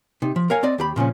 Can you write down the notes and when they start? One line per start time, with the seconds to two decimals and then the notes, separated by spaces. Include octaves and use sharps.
0.22 C3 D#4
0.36 F3
0.50 A#4 C#5 F5 F#5 G#5
0.63 C4 D5 D#5
0.78 D#2 G4 B5
0.96 A#2 C#3 F3 C#4